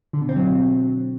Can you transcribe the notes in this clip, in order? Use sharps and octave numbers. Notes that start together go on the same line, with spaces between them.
D3
B2
C4
F#3